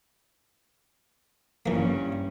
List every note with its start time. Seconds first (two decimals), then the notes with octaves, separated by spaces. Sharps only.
1.66 G2 E3 A#3 C#4